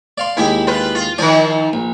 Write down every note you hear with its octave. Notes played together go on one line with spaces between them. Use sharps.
D5 F5 C6
D#2 G#3 E4 G4
F4 B4
F4
D#3 F3 D5 G#5
A#1